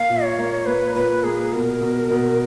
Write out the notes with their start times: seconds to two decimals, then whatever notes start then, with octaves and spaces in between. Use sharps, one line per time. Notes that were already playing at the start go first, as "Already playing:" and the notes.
Already playing: A#3 F5
0.09 A#2
0.24 C#5
0.38 A#3
0.66 A#3 B4
0.95 A#2 B4
1.23 A#3 G#4
1.53 B2 A#4
1.81 B2
2.10 B2